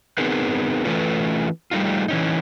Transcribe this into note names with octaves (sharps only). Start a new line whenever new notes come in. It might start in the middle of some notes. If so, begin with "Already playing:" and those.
B3 C4 D#4 G#4 A#4 B4
E3 A3 C#4 F4 A4 B4
G3 A3 D#4 F4
E3 C#4 D#4